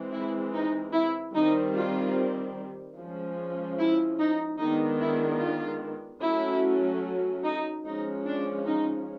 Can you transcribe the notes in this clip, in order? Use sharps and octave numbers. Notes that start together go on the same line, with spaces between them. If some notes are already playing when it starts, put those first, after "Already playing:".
Already playing: E3 G#3 C4
E4
D#4
E4
D#3 G3 C4 D#4
F4
F3 G#3 C#4
E4
D#4
D#3 G#3 B3 D4 D#4
E4
F4
F#3 A3 C#4 E4
D#4
F3 G#3 C#4 D#4
D4
D#4